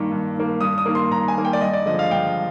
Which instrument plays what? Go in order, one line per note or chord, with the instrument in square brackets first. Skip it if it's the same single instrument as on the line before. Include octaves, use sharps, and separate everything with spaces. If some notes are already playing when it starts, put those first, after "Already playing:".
Already playing: [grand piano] G2 D#3 A#3
G2
D#3 A#3
G2 D#6
D#6
D#3 A#3
C6
G2 A#5
G#5
D#3 A#3
G5
D5
G2 D#5
D5
D3 F3 G#3 D#5
F5
G2 G5